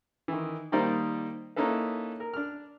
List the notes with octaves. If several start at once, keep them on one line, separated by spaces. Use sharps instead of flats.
D#3 E3
D#3 G3 A#3 D#4 C5 D5
A#3 C#4 D#4 E4 A4 B4
A#4
D4 F6